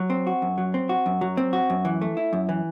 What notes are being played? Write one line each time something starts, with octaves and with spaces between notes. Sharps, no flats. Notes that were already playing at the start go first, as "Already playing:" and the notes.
Already playing: F#3
C4
F#4
F#2
F#3
C4
F#4
F#2
F#3
C4
F#4
F#2
E3
A3
E4
F#2
E3